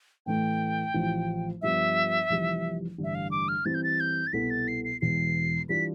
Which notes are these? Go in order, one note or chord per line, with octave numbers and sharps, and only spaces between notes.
A2 E3 A3 G5
A1 A2 F3
G2 F3 B3 E5
F1 F2 E3 G3
A1 G2 D3
E5
F5
D6
F6
E3 G3 C4 E4 A6
G6
A6
G6
A6
C2 B2 B3 E4 A4 B6
A6
C7
C7
E1 E2 B2 C7
E3 G3 D4 F4 B6